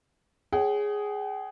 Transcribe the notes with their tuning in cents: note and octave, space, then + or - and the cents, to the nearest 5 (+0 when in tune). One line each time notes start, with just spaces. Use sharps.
G#4 +0 C#5 +0 G5 -45